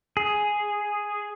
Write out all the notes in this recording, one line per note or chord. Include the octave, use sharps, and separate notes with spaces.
G#4